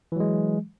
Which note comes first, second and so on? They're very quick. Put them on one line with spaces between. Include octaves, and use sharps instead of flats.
E3 F#3 G#3